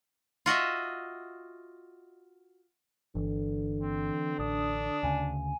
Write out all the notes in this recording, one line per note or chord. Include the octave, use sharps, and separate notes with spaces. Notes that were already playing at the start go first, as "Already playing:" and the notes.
F4 F#4 D#5 E5
G1 D3 E3
C4
A1 D4 D#6
D2 C#3 G#5